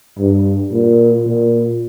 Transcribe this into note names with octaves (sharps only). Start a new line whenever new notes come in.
G2
A#2
A#2